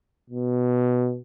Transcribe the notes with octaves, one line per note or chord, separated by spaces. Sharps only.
B2